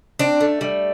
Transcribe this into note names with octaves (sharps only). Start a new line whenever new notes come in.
C4 D4
A3
G3